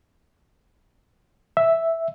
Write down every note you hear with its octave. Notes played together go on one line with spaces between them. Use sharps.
E5